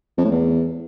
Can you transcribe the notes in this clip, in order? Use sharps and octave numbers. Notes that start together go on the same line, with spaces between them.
F2
A2
E2